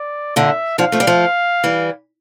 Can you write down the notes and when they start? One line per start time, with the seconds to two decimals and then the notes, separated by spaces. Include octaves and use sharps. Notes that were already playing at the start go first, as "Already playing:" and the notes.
Already playing: D5
0.36 A#2 D3 E5
0.78 D3 F3 F5
0.92 F3 A3
1.00 G3
1.07 F3 A3
1.64 E3 G3